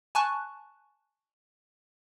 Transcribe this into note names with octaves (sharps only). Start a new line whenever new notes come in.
G#5 A5 C#6 F#6